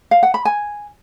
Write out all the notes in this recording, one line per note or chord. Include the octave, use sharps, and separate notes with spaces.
F5
F#5
B5
G#5